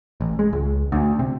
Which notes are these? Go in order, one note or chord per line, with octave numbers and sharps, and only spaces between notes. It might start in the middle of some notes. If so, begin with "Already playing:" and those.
A1
G#3
C#2
D2
C3